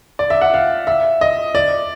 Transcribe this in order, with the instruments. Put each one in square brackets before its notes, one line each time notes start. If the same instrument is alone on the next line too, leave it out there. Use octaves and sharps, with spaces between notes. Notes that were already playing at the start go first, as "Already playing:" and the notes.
[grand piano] D5
E5
F#5
F5
E5
D#5
D5